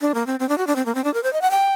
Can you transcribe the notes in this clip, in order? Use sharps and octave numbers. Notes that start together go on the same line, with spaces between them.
D4
A#3
C4
C4
D4
F#4
D4
C4
A#3
C4
D4
A#4
C5
D#5
F#5
G5